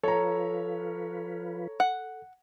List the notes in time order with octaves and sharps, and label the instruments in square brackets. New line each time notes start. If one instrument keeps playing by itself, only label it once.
[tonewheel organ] F3 F4 B4 [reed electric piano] A4 [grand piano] C#5 A#5
[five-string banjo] F#5